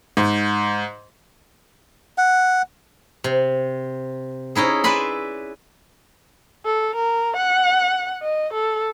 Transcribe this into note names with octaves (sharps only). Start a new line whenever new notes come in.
G#2
F#5
C3
C#4 D#4 E4 G#4
B4 D5 E5 G#5 B5 C6
A4
A#4
F#5
D#5
A4